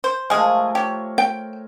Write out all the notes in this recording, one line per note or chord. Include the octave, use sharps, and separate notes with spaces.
C5
F3 G#3 A3 G#4 A#4
G4 C#5
G5